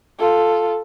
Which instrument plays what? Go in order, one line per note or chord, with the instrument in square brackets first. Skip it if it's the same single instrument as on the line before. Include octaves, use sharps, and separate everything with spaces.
[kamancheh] F4 A4